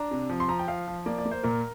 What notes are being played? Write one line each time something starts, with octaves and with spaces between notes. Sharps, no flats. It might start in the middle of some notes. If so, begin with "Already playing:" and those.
Already playing: D4 A#5
C3
F3
C6
F3 A#5
G5
F3 F5
F3
A#3 D5
D5
A#3
C5
A#2 A#4